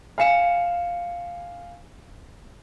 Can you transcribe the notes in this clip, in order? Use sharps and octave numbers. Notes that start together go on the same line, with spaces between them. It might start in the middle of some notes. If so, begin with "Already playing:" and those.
F5 G#5 C#7 E7